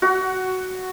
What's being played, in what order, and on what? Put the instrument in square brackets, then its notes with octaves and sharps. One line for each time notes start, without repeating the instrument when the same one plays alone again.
[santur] F#4 F#5